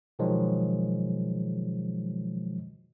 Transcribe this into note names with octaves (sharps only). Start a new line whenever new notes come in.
B2 D#3 F3 F#3 G#3